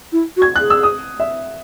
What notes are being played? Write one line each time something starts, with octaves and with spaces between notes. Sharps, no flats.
E4
F#4
G#6
G#4 F#6
E6
D#6
E5